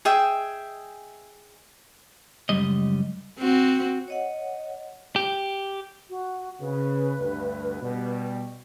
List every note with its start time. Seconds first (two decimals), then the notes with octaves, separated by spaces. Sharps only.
0.05 G#4 D#5 E5 G5
2.49 C#2 F#2 G3 D#5
3.39 C4 F#4
4.08 C#5 D#5 F#5
5.16 G4
6.09 F#4
6.61 C#3 B4
7.19 D2 G2
7.81 B2 G3